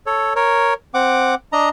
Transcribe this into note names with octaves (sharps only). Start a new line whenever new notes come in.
A4 C#5
A#4 C#5
C4 F#5 D6
D4 D#5 A#5